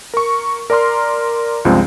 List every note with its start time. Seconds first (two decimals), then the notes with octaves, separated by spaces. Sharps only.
0.14 A#4 C#6
0.70 A#4 D5 A#5 C6 F6
1.65 C#2 G2 F3 G#3 C4